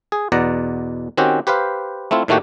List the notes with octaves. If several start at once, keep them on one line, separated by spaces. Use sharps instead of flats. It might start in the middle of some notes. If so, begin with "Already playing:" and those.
G#4
E2 B2 D5 F#5 A#5
D#3 C4 C#4 F#4 G4
G4 B4 C5 F5
A3 C4 E4 F4
A2 D#3 A3 A#3 F#4 G4